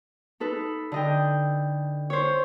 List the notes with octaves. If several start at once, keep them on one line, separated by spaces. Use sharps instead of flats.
D#4 A4 B4
D3 D#5 G5
C5 C#5